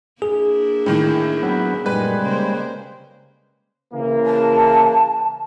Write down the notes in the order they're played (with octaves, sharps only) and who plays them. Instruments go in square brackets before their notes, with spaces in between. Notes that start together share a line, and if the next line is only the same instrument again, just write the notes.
[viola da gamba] A#3 D4 E4 [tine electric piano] G#4
[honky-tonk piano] A2 D#3 E3
[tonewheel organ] F#3 B3
[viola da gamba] F#2 A#2 D#4 [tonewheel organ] G3 G#3 [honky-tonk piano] B4
[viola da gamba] C#3 A#3 C5
[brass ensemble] C#3 E3 A#3
[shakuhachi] A5